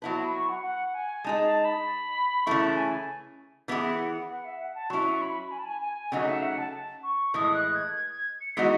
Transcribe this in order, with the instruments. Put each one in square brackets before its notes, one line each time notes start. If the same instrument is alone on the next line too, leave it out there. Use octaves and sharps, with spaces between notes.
[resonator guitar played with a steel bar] F#3 B3 E4 B4 [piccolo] A5
[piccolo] B5
C#6
F#5
F#5
G#5
[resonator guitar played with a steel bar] G#3 D#4 G#4 [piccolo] A5
[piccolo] A5
B5
[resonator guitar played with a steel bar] C#3 E3 A3 E4 [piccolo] C#6
[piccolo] A5
G#5
[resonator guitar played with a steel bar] E3 B3 E4 G#4 [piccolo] F#5
[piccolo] F#5
F#5
E5
F#5
A5
[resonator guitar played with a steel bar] F#3 C#4 E4 [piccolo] C#6
[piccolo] B5
G#5
A5
G#5
G#5
[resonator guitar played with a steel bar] C#3 F#3 A3 D#4 [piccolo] F#5
[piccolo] E5
F#5
A5
C#6
[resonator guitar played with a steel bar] A2 E3 G#3 [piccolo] D#6
[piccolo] F#6
G#6
G#6
G#6
C#7
[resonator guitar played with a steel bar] E3 G#3 B3 D#4 F#4 [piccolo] B6